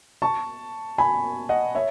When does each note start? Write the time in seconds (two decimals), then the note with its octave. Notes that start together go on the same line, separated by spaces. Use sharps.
0.22 A5 C#6
0.98 G#5 B5
1.49 D#5 F#5
1.75 C#5 E5